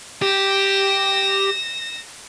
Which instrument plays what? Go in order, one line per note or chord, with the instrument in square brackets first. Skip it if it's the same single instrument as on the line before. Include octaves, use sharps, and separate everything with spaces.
[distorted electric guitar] G4 [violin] A#6 E7